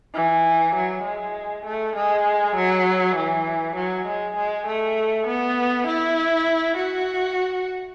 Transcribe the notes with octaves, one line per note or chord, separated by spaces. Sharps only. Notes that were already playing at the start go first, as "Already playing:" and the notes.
E3
F#3
G#3
A3
G#3
F#3
E3
F#3
G#3
G#3
A3
B3
E4
F#4